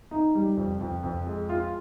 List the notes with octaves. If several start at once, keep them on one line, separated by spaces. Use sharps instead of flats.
D#4
G3
F2
F2
F2
G#3
F4